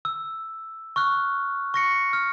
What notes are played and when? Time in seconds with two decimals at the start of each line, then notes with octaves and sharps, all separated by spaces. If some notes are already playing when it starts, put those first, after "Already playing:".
0.05 E6
0.96 C#6 F6 F#6
1.74 C#6 A#6 C#7
2.13 F6